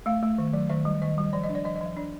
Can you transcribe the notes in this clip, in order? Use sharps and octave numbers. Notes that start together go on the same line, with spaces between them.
A3 F5
A3
D#3
F#3
D#3 E5
G3
D#3 D#5
G3
F3 D5
D#5
D4
D5
F3 D#5
D#5
F3 E5
D4 D5